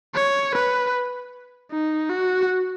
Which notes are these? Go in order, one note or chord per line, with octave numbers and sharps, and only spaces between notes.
C#5
B4
D#4
F#4